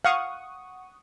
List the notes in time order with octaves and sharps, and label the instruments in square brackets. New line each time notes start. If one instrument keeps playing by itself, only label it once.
[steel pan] F5 [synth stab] F#5 C#6 D#6